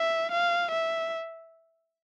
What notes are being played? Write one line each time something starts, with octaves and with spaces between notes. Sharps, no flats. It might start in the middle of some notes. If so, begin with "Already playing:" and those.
Already playing: E5
F5
E5